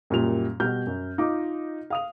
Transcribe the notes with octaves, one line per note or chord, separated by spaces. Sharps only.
F#2 A#2 G3 F7
B2 G3 F6 G6
F#2
D#4 F4 D6
F5 D#6 F7